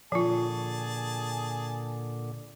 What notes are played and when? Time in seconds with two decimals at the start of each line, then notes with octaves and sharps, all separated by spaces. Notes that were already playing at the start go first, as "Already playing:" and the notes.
0.12 A#2 D3 F3 F4 G#4 A5